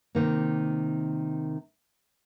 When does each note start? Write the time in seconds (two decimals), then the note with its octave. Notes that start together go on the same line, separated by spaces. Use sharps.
0.15 C3 D#3 A#3